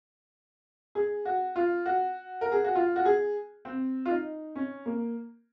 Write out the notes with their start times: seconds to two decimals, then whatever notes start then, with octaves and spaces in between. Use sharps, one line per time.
0.95 G#4
1.25 F#4
1.56 F4
1.86 F#4
2.41 A#4
2.52 G#4
2.64 F#4
2.75 F4
2.96 F#4
3.05 G#4
3.65 C4
4.06 F4
4.10 D#4
4.56 C#4
4.86 A#3